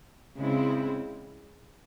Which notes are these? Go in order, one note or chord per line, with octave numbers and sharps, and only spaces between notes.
C#3 G#3 C4 E4